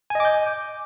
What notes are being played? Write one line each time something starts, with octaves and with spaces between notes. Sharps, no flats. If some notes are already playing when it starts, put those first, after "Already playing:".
D#5 G#5 D6 G6